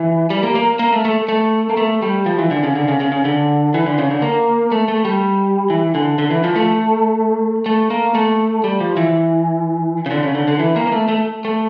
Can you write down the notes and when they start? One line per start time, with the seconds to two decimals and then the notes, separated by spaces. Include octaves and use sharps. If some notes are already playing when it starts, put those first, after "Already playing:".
Already playing: E3
0.30 G3
0.43 A#3
0.55 A#3
0.79 A#3
0.93 A3
1.05 A3
1.28 A3
1.70 A#3
1.77 A3
2.02 G3
2.26 F3
2.39 E3
2.51 D3
2.63 C#3
2.75 D3
2.88 C#3
3.00 C#3
3.12 C#3
3.25 D3
3.74 E3
3.87 D3
3.98 C#3
4.11 D3
4.22 A#3
4.72 A3
4.88 A3
5.05 G3
5.70 E3
5.95 D3
6.18 D3
6.30 E3
6.44 F3
6.56 A3
7.66 A3
7.90 A#3
8.15 A3
8.64 G3
8.80 F3
8.97 E3
10.06 C#3
10.11 D3
10.23 C#3
10.35 D3
10.48 D3
10.59 E3
10.76 A#3
10.87 A#3
10.92 A3
11.08 A3
11.45 A3